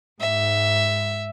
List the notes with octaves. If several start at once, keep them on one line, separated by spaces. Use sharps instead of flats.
G#2 E5